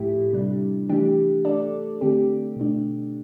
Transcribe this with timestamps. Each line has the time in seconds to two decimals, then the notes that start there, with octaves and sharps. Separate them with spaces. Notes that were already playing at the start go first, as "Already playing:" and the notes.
Already playing: A2 F3 A3 E4 G4
0.33 C3 G3 D4
0.89 E3 A3 D4 G4
1.45 A3 D4 A4 D5
2.01 D3 A3 C4 G4
2.56 B2 A3 D4